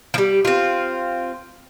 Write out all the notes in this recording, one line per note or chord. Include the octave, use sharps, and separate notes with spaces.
F3 G3
C4 F4